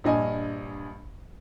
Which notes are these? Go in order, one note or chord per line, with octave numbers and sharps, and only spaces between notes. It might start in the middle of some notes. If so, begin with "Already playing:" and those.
A#1 G2 D#5 G#5